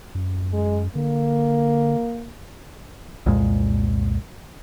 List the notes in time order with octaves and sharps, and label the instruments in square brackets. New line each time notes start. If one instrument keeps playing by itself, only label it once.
[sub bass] F#2
[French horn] G#3
[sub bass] D3 [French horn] A#3
[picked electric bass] C2 F2 A#2 G#3